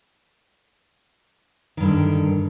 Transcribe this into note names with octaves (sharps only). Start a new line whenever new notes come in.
G2 D3 D#3